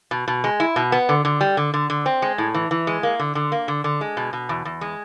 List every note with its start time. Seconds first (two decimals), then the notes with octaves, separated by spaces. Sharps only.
0.11 B2
0.28 B2
0.44 G#3
0.60 E4
0.76 B2
0.92 B3
1.09 D3
1.25 D3
1.41 G3
1.57 D3
1.74 D3
1.90 D3
2.06 C4
2.22 G#3
2.38 A2
2.54 E3
2.71 E3
2.87 G#3
3.03 A#3
3.19 D3
3.35 D3
3.52 A#3
3.68 D3
3.84 D3
4.01 G#3
4.17 B2
4.33 B2
4.49 E2
4.65 E2
4.81 G#3